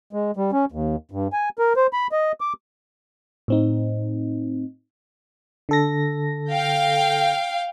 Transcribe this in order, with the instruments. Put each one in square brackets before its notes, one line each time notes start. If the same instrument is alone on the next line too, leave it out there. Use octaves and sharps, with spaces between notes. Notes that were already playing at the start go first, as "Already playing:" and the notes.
[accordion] G#3
G3
C#4
D#2
G2
G#5
A#4
C5
B5
D#5
D6
[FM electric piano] A2 C4 D#4
D3 A4 A#6
[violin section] F5 G5